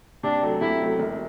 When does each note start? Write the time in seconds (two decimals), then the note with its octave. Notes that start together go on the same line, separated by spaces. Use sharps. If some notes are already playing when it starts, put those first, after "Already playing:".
0.23 C3 D4
0.43 F#3 A3
0.61 C3 E4
0.80 F#3 A3
0.99 E1